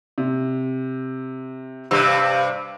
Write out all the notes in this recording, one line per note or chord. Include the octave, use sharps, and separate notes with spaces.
C3
G2 C3 F5 E6